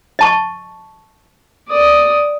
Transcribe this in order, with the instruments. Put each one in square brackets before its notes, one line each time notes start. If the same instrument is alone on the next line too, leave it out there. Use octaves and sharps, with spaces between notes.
[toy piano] D#5 A5 C#6
[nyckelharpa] D5 D#6